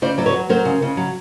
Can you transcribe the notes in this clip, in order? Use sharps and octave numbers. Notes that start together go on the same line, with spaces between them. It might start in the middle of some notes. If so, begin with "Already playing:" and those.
C#3 C5 D5
F#3 D5
B4 C#5
F#3
F#3 A#4 C5
C#3
C#3
F#3